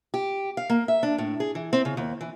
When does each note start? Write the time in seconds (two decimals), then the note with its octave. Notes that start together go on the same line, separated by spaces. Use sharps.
0.14 G4
0.57 F5
0.70 A#3
0.88 E5
1.03 D4
1.18 A2
1.40 G#4
1.55 E3
1.73 C4
1.85 C#3
1.97 D#2
2.21 E3